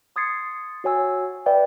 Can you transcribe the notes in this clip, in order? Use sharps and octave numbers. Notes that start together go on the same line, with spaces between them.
C6 D#6 G#6 A6 C7 C#7
F#4 C#5 G#5 E6
B4 D5 E5 G5